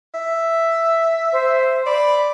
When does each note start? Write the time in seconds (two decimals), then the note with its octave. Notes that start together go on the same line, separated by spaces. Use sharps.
0.14 E5
1.33 C5
1.86 D5 B5